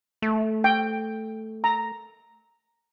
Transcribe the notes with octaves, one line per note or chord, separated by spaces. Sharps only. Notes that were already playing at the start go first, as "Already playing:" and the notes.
A3
G5
A#5